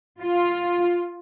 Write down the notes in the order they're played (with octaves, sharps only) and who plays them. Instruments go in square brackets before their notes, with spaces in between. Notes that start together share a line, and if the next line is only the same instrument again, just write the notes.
[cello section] F4